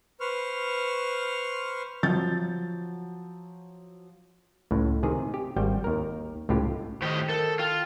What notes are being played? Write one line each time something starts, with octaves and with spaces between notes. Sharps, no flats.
B4 C5 C#6 F6
F3 F#3 G6 A6
C#2 A2
C3 D#3 G#4
G4
G#1 G3 G5
D#2 A#4
C#2 A2 F4 G4
A2 D#3 G4 D#5
A4 A#4
F4 G5